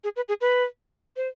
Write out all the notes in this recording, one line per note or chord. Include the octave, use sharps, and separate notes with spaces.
G#4
B4
G#4
B4
C5